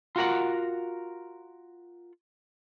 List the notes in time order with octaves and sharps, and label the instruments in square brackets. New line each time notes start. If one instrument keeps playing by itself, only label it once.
[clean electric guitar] F4 F#4 A#4 F#5